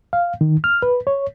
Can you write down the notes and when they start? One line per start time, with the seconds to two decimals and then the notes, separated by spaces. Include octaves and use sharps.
0.13 F5
0.41 D#3
0.64 F6
0.82 B4
1.07 C#5